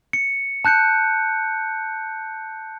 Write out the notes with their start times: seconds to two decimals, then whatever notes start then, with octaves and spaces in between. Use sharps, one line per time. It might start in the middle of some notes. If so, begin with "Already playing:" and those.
0.13 C#7
0.65 A5 F#6 G6 C#7